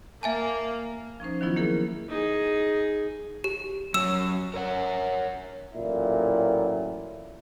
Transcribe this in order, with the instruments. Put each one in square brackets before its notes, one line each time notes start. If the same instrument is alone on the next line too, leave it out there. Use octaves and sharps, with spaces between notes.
[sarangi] A#3 [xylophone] E5 G#5 A5
[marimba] F3 C#4 D#4 C5
D#3 F3 F#3 B3 E4 F4
E3 A#3 E4 G#4 A#4
[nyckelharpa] D#4 G#4
[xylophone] G4
[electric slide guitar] F#3 C#4 F#4 [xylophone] E6 E7
[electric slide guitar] A#4 C#5 F#5
[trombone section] A1 A#2 F#3 E4